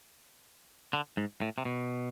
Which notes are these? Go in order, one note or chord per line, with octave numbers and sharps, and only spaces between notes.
D3
G#2
A2
C3
B2